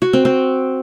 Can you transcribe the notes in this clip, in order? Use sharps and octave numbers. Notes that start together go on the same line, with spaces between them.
F#4
C4
C4